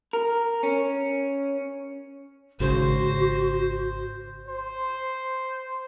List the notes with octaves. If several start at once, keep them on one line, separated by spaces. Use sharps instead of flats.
A#4
C#4
G#1 C#3 F#4 C5
C5